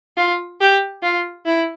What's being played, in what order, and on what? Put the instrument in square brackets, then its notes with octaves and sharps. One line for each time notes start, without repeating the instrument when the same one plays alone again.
[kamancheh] F4
G4
F4
E4